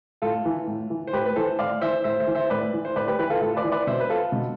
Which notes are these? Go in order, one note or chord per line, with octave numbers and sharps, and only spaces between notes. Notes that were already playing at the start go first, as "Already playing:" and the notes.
A2 F4 A4
E3
A2
E3
C5
A2 G4 B4
B4
E3 A4 C5
A2 D5 F5
E3 C5 E5
A2 C5 E5
C5 E5
E3
C5 E5
A2 B4 D5
E3
C5
A2 B4 D5
G4 B4
E3 G4 B4
F4 A4
A2 F4 A4
B4 D5
E3
B4 D5
B2 C5 E5
B4
F4 A4
B2